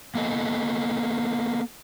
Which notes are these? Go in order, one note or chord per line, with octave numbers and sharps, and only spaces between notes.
A#3 B3 A4 D#5